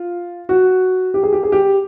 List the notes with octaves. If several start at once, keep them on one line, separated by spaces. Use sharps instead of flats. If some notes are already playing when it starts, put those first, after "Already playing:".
Already playing: F4
F#4
G4
G#4
G4
G#4
G4